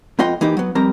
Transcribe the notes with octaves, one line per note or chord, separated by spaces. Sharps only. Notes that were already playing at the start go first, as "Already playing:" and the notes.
F2 B3 F4 D#5 G5
E3 A#3 D#4 G4
F#3 B3
F2 G3 C4 A#4 A#5